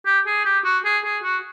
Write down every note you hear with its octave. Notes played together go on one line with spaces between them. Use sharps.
G4
G#4
G4
F#4
G#4
G#4
F#4